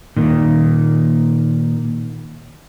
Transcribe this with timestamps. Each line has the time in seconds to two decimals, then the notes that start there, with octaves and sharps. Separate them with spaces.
0.16 A#2 D#3